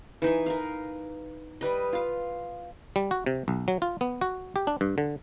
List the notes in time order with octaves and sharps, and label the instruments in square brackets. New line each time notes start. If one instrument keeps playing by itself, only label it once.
[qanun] E3 D#4 G#5
A#4 B4 F5
G3 B4 D#5
F4 F5
[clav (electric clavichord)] G3
F#4
C3
B1
F#3
F4
B3
F#4
G4
D4
G2
D3